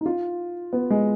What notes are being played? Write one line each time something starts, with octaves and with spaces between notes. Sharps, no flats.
D#4
F4
B3
G#3